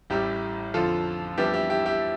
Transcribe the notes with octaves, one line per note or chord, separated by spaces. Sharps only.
A1 A2 G3 E4 G4
F2 D3 F3 F4 A4
F2 E3 G3 B3 D4 E4 G4
E4 G4
E4 G4
E4 G4